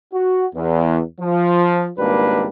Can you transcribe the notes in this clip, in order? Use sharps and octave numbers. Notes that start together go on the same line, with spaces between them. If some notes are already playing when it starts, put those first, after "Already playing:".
F#4
E2
F3
G#1 C#2 G3 A#3 D4 B4